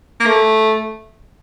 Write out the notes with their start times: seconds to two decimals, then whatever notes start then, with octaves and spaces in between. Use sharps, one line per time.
0.20 A#3
0.26 A3